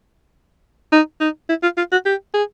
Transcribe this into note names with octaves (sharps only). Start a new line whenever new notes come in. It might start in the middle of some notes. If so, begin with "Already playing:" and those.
D#4
D#4
E4
F4
F4
F#4
G4
G#4